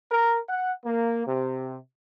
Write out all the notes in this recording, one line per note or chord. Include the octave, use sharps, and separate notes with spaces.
A#4
F#5
A#3
C3